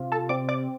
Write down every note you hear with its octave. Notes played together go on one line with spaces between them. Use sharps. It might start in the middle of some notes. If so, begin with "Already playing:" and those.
Already playing: C3 F4
A4 A5
C4 D5 D6
D5 D6